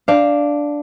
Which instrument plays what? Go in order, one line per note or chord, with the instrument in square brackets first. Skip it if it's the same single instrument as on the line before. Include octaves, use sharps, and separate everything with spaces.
[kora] D4 F5